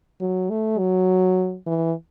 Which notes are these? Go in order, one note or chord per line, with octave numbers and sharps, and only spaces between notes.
F#3
A3
F#3
E3